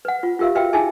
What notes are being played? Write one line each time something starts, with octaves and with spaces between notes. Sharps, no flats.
B4 F#5
F4
F4 G4 A#4 E5 F5
F#4 B4 E5 F5 G5
D#4 E4 G#4 E5 G#5 A5